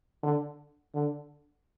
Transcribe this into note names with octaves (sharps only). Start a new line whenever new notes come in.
D3
D3